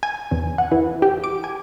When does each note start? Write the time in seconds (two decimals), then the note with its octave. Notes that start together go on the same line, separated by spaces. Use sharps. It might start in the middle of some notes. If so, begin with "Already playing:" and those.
0.03 G#5
0.31 E2
0.58 F#5
0.72 E3
1.02 G4
1.24 D6
1.44 G#5